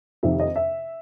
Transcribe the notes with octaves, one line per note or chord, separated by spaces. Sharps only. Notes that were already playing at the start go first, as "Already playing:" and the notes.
F2 C3 D#3 G3 E5
D#5
E5